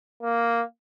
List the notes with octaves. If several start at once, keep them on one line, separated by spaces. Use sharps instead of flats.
A#3